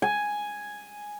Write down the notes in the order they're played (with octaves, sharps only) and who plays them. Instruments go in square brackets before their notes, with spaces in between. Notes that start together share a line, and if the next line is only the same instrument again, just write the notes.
[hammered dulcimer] G#5